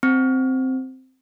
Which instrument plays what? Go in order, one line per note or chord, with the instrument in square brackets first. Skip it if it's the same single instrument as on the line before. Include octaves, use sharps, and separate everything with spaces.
[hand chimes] C4